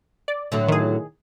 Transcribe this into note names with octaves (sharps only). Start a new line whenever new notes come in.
D5
A2 D3 F#3
D#3 G#4